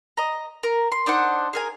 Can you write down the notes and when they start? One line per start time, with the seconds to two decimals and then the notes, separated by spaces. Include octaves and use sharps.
0.17 D#5 A#5
0.63 A#4
0.92 C6
1.06 D4 D#4 C5 F#5
1.53 G#4 A#4 G#5